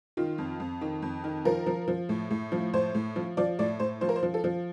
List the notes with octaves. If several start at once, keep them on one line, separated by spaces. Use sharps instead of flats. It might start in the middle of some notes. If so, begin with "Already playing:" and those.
D#3 F4
F2
F2
D#3
F2
D#3
F3 A#4
F3
F3
A2
A2
F3
A2 C5
A2
F3
F3 D5
A2 D5
A2 C5
F3 C5
A#4
C5
F3
A4
F3